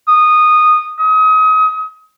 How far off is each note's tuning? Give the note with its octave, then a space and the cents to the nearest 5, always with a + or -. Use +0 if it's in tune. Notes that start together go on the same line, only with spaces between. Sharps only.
D#6 -15
D#6 +30